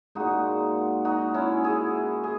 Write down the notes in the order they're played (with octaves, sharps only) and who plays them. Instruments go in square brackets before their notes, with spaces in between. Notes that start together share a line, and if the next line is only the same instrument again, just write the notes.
[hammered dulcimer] A#2 G#3 D#4 F#4
D#4 F#4
C#4 E4
E4 G#4
G#4